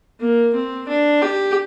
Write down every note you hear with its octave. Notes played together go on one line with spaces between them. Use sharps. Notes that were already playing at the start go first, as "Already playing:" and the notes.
A#3
C4
D4
G4